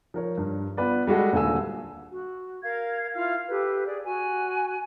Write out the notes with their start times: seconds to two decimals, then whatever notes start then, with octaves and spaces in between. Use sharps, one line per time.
0.14 F3 A#4 C#5
0.37 G2
0.77 B3 F4 B4 D5
1.07 G3 G#3 F#4 A4
1.33 D#1 D3 A4 G#5 E6
2.12 F#4
2.63 A#4 F5 G#6
3.14 E4 F4 F5 F6
3.48 G4 A4 B4
3.87 G#4 D5
4.05 F#4 G#5